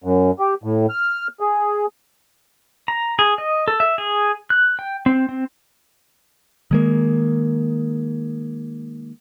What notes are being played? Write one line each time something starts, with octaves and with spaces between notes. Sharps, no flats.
F#2
G4
A2
F6
G#4
A#5
G#4
D#5
A4
E5
G#4
F#6
G5
C4
C4
D#3 G#3 A#3